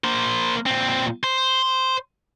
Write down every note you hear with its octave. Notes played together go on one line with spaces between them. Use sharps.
A#3 C5
A#2 C4
C5